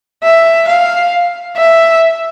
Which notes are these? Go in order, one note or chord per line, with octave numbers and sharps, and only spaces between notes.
E5
F5
E5